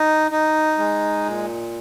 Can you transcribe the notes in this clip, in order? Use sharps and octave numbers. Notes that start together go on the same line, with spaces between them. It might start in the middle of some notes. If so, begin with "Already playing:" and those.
Already playing: D#4
D#4
G#3
A#2